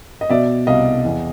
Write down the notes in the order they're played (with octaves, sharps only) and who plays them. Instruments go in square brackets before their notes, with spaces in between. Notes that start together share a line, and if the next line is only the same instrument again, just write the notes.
[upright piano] D#5
B2 D5 E5
C2 D#5 F5
E2